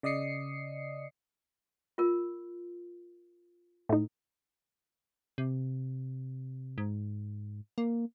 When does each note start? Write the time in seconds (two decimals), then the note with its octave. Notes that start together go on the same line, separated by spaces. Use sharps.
0.03 C#3 D5 D#5 D#6 C7 C#7
1.98 F4 A#4
3.89 A2 D#4
5.38 C3
6.78 G#2
7.78 A#3